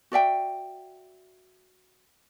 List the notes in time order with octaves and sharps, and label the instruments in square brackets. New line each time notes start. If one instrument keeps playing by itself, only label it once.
[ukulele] F#4 D5 E5 G5